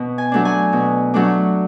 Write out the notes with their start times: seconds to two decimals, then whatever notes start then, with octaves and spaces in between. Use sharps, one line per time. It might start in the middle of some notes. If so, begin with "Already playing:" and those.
Already playing: B2
0.18 G#5
0.32 F#3 A3 D4
0.45 G#5
0.73 B2
1.14 F#3 A3 D4